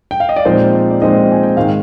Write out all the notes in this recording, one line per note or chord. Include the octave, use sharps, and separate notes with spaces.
G5
F5
D#5
D5
A#2 F3 G#3 C4 D#4 C5
D5
A#2 F3 G#3 C4 D#4 D#5
G#5
G5
G#2 D#3 G#3 F5